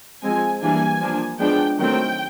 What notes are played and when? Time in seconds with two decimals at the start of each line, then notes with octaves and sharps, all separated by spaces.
0.23 F3 G#3 C4 G#5
0.62 E3 G3 A#3 D4 G#5
1.01 F3 A#3 D4
1.39 F3 G#3 B3 D4 G5
1.78 D#3 F#3 A3 C4 G5